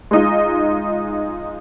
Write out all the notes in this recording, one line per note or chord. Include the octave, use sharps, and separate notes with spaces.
G#3 D#4 F4